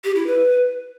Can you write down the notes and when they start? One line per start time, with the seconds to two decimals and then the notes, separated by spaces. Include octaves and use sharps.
0.04 G4
0.15 E4
0.27 B4